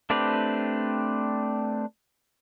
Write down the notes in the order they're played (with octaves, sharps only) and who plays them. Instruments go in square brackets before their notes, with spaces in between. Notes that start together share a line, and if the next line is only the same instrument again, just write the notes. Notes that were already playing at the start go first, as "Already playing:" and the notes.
[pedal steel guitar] A3 C4 D4 G4 B4